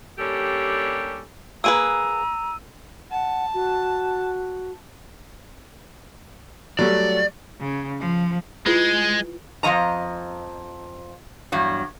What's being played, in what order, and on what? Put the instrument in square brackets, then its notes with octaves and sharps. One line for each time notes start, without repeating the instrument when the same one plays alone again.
[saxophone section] G3 A#3 C#4 D4 G4 A4
[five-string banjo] A#3 G#4 B4 [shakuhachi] A#5 [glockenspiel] E6 D#7
[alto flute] F#5 [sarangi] A5
[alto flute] F#4
[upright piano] F#3 G3 A3 [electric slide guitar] D5
[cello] C#3
F3
[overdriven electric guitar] G#3 [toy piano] E4 F4 B4
[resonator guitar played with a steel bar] F2 G#2 F3 D#5 A#5
E2 G2 F#3